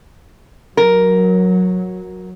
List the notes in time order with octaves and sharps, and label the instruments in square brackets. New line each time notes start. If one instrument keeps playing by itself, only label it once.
[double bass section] F#3 [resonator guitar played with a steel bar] A#4